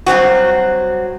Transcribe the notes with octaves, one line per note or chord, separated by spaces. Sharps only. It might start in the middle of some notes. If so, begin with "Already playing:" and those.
G2 F#3 C4 F#4